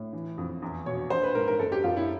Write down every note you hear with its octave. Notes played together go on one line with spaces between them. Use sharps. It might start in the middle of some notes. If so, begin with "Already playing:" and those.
Already playing: A2
E3
F2
E2
B2 C#5
A#1 C5
B4
G#2 A#4
A#4
F#1 A4
G4
F#2 F4
E4